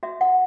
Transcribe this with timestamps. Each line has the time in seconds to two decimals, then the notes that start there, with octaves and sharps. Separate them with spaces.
0.03 F#4 E5
0.21 F#5